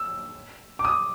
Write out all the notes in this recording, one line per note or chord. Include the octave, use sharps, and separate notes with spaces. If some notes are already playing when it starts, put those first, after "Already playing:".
Already playing: E6
D6
D#6